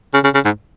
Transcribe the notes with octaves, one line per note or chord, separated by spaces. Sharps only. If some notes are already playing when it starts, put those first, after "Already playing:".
C#3
C#3
C#3
G#2